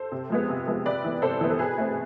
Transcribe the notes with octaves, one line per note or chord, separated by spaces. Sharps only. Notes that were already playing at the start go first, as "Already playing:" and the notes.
Already playing: A4 C5
C3
F3 G#3 B3
C3
F3 G#3 B3
C3 B4 D5
E3 B3
C3 A4 C5
E3 B3
A4
B2 G#4 B4
A3 C4